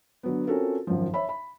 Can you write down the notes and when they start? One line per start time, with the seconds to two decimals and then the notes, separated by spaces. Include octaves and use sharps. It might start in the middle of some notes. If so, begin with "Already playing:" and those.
0.23 D3 F#3 B3
0.47 C4 C#4 F4 F#4 A4 A#4
0.87 G#1 F#2 F3
1.14 C#5 E5 B5
1.29 B5